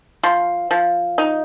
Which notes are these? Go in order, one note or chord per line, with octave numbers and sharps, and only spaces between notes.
F3 C6
F3
D#4